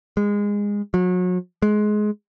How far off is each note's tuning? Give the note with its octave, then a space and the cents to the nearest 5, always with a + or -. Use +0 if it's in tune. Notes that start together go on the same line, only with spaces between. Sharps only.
G#3 -20
F#3 -35
G#3 +20